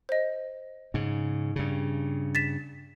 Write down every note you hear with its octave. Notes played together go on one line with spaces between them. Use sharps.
C5 D#5
G#2 C#3
G2 C#3
A6 B6 E7